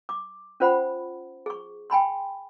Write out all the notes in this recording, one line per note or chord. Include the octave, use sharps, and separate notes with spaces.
D6
C#4 F4 C5 F#5 B5
G#4 C#6
G5 G#5 B5 C6